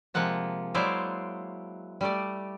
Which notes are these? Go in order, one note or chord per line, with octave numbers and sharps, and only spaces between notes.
C3 F3 G#3 A#3 F#5 A5
F#3 G#3 E4 C5 D5 F5
G3 A3 D5